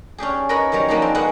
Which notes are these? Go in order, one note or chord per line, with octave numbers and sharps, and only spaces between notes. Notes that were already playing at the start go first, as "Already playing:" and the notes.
C#4 D4 G4 G#4
A#4 B4 C#5 D#5 B5
D#3 F#3 G3 C#5 A#5
F3 F#3 A#3 D4 D#4 G#4
C4 D4
G#3 A#3 B3 C#4 G#4 F#5